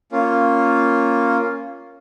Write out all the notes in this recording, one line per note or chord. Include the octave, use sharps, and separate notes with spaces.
A#3 C#4 F4